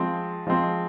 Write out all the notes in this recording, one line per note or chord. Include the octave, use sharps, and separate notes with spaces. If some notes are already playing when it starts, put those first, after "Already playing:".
Already playing: F3 G#3 C4
F3 G#3 C4